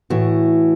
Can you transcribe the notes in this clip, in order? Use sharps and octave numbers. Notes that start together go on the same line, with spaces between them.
A2 E3 E4 F#4